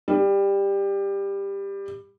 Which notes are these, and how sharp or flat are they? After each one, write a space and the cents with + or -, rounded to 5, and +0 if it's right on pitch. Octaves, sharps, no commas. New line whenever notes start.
G3 +15